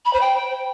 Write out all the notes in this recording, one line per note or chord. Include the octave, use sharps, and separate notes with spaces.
B5
C5
G5